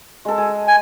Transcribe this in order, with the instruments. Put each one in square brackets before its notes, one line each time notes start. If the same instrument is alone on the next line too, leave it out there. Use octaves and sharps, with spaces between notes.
[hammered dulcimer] G#3 A4
G#4
[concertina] G#5